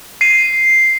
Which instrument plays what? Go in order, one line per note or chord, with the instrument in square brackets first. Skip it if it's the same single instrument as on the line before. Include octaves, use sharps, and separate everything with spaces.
[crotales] C7 D#7